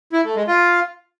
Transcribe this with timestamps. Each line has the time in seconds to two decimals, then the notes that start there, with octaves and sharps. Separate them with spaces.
0.13 E4
0.24 A3
0.36 G#3
0.47 F4